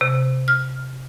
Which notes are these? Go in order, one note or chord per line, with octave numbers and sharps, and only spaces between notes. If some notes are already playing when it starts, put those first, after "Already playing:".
C3
F6